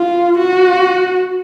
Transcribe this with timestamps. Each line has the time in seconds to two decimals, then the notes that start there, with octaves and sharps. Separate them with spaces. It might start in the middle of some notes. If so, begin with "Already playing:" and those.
Already playing: F4
0.38 F#4